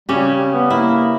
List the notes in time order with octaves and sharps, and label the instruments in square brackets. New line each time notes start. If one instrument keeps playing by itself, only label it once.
[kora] C#3 C#4 G4 [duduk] G3
[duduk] B3
[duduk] A#3 [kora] E4